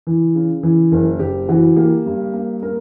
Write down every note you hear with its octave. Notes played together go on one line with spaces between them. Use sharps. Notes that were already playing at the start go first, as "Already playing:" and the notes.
E3
C#3
E3
F#1 A#4
F#1 G4
E3 F#4
A#3 G4
G2
A#3
A#3 A#4